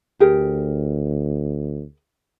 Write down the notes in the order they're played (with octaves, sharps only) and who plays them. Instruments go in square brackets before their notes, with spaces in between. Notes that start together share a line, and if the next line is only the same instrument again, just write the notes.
[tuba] D2 [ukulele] G4 G#4 A#4